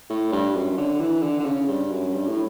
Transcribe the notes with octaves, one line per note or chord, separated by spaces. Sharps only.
A2
G2
F#2
D3
E3
D3
D3
C#3
G2
F#2
G2
A2